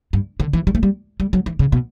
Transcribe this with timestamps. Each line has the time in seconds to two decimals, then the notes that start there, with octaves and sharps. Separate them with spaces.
0.13 G2
0.40 D3
0.53 E3
0.67 G3
0.75 A3
0.83 G3
1.20 G3
1.33 F#3
1.46 E3
1.59 C#3
1.72 B2